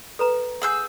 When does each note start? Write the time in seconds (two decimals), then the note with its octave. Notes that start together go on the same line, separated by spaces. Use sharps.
0.19 A4 B4 A#5
0.62 G#4 F#5 G#5 E6 G6